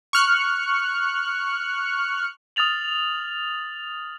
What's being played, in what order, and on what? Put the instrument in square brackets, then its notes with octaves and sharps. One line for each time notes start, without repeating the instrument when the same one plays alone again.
[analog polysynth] C#6 F6 F#6 C#7
[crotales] D#6 F6 A6 F7 F#7